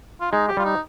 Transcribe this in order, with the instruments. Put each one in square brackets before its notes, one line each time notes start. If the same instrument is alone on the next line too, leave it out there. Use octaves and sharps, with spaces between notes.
[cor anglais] F4
[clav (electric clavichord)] G#3 [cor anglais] D#4
[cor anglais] G4
[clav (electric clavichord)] G3 [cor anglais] F4
[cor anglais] D#4